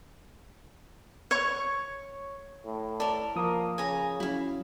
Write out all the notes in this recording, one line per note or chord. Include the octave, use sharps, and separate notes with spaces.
C#5 C#6
A2
A4 A#4 D5
F3 A#3 D#6
C#3 G#5 A#5
F#3 C#4 E4 F5